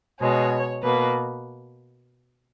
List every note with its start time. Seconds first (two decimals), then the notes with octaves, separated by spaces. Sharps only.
0.21 B2 G#3 C#5
0.82 B2 A#3 B4